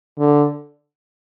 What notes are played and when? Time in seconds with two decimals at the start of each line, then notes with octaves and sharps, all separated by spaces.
0.19 D3